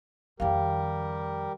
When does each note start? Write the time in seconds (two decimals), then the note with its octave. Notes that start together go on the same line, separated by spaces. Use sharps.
0.40 F2 D#3 G3 G4 A#4 F5 G5